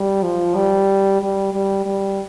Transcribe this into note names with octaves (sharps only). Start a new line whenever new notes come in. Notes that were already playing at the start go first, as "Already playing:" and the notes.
Already playing: G3
F3
G3
G3
G3
G3